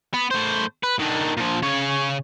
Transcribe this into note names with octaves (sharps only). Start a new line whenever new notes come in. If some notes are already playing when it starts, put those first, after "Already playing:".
B3
A2 C5
B4
D#3 D4
A#2 F3
C#3 C#5